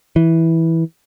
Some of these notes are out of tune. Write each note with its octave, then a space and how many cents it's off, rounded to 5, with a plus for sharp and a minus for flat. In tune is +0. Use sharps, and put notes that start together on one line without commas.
E3 -10